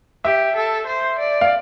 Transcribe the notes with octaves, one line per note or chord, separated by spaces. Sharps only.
G4 E5
A4
C5
D5
F5